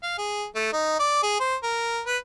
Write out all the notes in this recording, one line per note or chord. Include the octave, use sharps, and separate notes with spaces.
F5
G#4
A3
D#4
D5
G#4
C5
A#4
B4